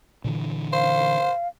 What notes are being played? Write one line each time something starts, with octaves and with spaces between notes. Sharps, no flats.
A#2 D3 E3
C5 F5